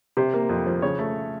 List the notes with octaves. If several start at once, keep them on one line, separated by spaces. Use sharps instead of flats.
C3 C5
A#3
F2
F3
C#3 C#5
A3